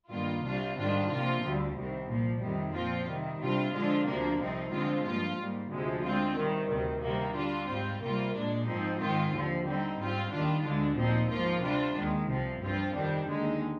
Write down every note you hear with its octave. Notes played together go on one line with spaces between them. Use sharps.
G2 D#3 A#3 F4
C2 C3 G3 D4 F4
G#2 D#3 G3 D4 F4
C3 F3 A#3 F4
D2 D3 G3
C2 C3 D#3
A#2 F3 A#3
F2 C3 D#3 G3
A#2 F3 C4 F4
C3 D#3 G3
C3 G3 D4 F4
D3 F3 G#3 D4 F4
D2 C3 F3 A#3 D4
C2 C3 F3 C4 D#4
D3 F3 G#3 C4 F4
G2 F3 A#3 F4
G#2 G3 A#3
D2 C3 F3 G#3
D3 G#3 C4 F4
C3 D#3 G3
D2 C3 D#3
C3 D#3 G3 A#3
D3 G3 D4 F4
G#2 G3 C4 F4
C3 G3 A#3 F4
A#2 G#3 D4
G#2 F3 C4 D#4
G#2 D#3 G#3 C4 F4
D#2 D3 F3
D3 G3 C4 D#4
G#2 G3 C4 F4
D#2 D#3 G3 D4 F4
D2 D3 G#3 D4
A#2 F3 C4 D#4
G#2 F3 A#3 F4
C3 G3 D4 F4
D#2 D#3 G#3
C2 C3 F3
G2 F3 C4 F4
F2 D#3 G3 D4
D#2 D3 G#3 D#4